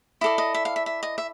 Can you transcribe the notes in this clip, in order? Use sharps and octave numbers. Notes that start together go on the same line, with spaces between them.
E4 A4 D5 D#5
D#5
E5
F5
E5
E5
D#5
E5